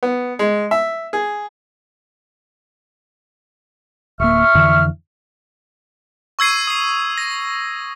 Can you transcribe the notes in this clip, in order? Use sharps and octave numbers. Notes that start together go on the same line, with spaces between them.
B3
G#3
E5
G#4
D1 A#3 E5 C#6 F6
F2 D3 E3
C#6 E6 G#6 C7 D#7
D#6 C7
A#6